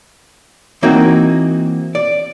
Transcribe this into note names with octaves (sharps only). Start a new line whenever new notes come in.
E3 A#3 C4 D#4 F#4
D5